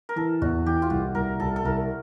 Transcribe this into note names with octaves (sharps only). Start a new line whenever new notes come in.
A#4
E3 A4
E2 F#4
E3 G4
F4
C2 F#4
C2 A#4
C2 A4
A4
C2 A#4